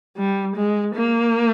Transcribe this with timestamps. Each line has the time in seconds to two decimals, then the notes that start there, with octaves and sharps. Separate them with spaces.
0.17 G3
0.56 G#3
0.95 A#3